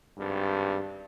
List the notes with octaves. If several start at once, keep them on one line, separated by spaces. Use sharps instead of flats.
G#1 G2